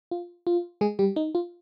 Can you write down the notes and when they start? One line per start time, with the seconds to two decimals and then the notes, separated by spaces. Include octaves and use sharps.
0.11 F4
0.47 F4
0.81 G#3 G#4
0.99 G3 G4
1.16 D#4
1.35 F4